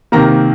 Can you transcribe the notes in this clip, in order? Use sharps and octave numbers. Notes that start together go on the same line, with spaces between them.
C3 D#3 A#3 A#5